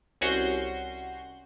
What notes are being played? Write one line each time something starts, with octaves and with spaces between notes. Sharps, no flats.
C2 C#4 F#4 C6 G6